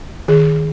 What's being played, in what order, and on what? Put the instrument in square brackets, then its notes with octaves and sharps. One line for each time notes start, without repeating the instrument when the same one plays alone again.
[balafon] D#3 G#4